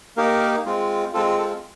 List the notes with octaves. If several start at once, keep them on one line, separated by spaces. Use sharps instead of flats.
A#3 D#4 G4 A#4
G#3 C4 F4
G#3 C4 F4 A4
A4